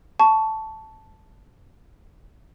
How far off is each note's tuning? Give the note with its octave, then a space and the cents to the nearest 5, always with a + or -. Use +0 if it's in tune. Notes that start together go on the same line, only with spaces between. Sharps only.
A5 +0 C#6 +15